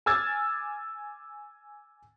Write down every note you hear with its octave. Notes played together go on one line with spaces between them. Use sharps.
G#5 D6 E6 F6 G#6 A6